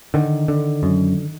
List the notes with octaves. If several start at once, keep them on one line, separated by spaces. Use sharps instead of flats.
D3 D#3
D3
F#2